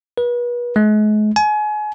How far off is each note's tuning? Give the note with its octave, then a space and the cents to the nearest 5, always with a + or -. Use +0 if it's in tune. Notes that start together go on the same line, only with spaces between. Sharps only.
B4 -35
G#3 +40
G#5 +30